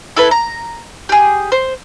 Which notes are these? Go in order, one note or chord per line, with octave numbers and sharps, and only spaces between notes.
E4 A4 B4
A#5
G4 G#4
C5